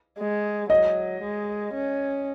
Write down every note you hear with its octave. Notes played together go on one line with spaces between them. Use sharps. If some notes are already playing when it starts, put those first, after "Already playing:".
G#3
F#3 D#5
G#3
C#4